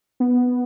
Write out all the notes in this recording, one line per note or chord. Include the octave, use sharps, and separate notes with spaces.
B3